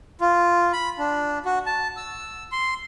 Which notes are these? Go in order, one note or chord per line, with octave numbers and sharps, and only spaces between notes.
F4
B5
D4
F#4
A5
E6
C6